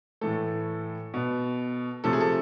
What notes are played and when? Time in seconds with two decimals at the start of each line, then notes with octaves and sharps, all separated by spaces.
0.21 A2 E3 A3 A4
1.14 B2 B3
2.04 C3 F3 A3 A4
2.13 G#4
2.20 A4